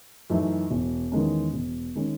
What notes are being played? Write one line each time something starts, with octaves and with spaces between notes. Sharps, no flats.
F#2 E3 A3 D#4
E1
E2 D#3 G#3 C#4
E1
D#3 G#3 C#4